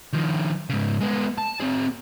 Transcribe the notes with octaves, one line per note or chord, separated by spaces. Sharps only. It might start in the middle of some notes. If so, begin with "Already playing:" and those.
D#3 F3
G#2 C#3
G#3 B3
A5
C4 G#4